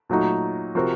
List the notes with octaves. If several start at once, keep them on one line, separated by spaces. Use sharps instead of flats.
A#2 F#3 A3 D#4 F#4
C3 F3 C4 F#4 A#4